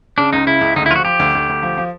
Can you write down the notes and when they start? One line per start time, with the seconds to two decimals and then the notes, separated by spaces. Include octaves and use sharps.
0.18 C#3 D4
0.33 C#2 D#4
0.47 C#3 E4
0.61 C#2
0.76 D2 D#4
0.86 E4
0.91 F3 F4 F#4
1.05 F3 G4
1.19 D2
1.35 D2
1.49 D2
1.63 F3
1.78 F3